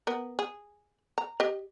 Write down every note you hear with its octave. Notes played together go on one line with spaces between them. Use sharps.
B3 A#4
G#4
A#5
G4 D#5